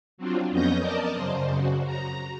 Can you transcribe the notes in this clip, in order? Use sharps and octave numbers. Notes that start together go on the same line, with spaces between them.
F#3 C4 D4 F4
F2 B3 C#4 D#5 G6 A#6
A#4 D5 D#5 A5
F#2 C#3 C5
C#3 F#4
A#5